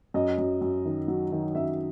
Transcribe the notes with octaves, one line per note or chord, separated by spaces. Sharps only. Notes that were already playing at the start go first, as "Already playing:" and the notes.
F#2 D#5
F#2
F#2
D#3
F#3
D#3
F#2 E5